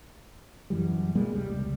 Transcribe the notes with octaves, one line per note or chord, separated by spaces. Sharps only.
F#2 E3 G3
B2 G3 G#3 A#3
F1 C#2 G3